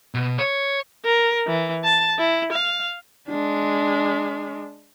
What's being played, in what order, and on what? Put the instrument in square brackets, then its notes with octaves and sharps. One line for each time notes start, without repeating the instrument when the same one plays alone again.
[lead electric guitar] B2
C#5
[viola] A#4
E3
A5
E4
F5
[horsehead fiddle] G#3 D4